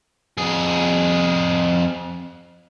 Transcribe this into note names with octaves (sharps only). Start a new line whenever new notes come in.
F2 G#4